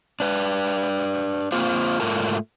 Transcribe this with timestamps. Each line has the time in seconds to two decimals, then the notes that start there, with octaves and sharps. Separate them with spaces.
0.20 D4 B4
1.52 A#3 C4 F4 C5 F5
2.00 G#2 F3 A3 F4 A#4 A5